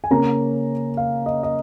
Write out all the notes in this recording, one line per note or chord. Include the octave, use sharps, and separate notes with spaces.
G#5
C#3 A#3 C#4 A#5
F5
D#5
D#5